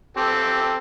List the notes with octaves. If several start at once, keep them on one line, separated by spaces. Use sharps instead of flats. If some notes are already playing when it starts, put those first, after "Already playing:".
C4 G4 A4